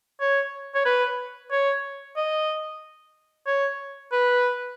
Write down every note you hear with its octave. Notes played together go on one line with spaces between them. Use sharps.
C#5
C#5
B4
C#5
D#5
C#5
B4